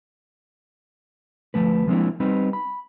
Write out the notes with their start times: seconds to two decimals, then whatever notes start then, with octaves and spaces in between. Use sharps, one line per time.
1.54 D2 G#2 F3 A3 B4
1.87 F3 G#3 A#3 C4 D4 E4
2.20 G3 C4 D#4 B4
2.53 B5